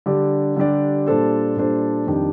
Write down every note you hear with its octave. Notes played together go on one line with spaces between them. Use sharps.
D3 G3 D4 G4 D5
D3 G3 D4 G4 D5
A#2 G3 D4 A4 C5
A#2 G3 D4 A4 C5
F2 D#3 G3 D4 G4